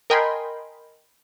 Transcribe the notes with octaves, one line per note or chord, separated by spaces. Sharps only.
A#4 D#5 G5 G#5 B5 C6